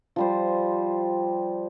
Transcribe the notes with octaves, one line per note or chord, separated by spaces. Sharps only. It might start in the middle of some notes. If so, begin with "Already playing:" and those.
F3 G3 C5